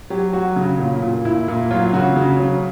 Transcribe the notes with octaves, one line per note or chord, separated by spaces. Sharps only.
F#3 G4
F#3 F#4
C#3
A#2
A#2
A#2 E4
A#2
F#3 F4
C#3 F#4
C#3
F#3